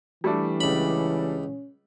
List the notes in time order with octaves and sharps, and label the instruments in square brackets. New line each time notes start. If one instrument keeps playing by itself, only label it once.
[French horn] E3 [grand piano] G3 A3 D4
[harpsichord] C#2 B5 [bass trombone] C#4